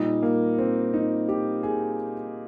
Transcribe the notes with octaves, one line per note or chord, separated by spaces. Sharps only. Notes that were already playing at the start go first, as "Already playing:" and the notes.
Already playing: A#2 G3 D#4
A#3
C4
D#4
G4
G#4